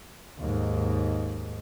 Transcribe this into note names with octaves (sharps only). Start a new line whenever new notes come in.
D#2 G#2